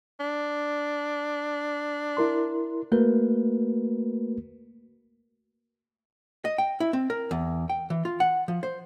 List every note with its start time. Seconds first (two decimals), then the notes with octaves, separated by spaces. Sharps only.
0.20 D4
2.17 E4 A#4 C6
2.92 A3 A#3 F#4 A#4 B4
6.45 D#5
6.58 G5
6.80 E4
6.93 C4
7.10 A#4
7.31 E2
7.69 G5
7.90 E3
8.05 F4
8.20 F#5
8.48 F3
8.63 C5